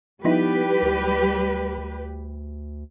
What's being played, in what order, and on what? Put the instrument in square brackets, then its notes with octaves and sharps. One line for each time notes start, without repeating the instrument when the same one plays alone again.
[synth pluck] F3 D#4 E4 [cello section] G3 G4 B4 [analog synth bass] B3
[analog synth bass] D2
D2